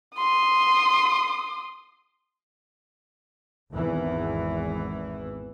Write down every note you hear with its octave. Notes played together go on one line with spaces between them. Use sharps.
C6 D#6
G#1 E2 E3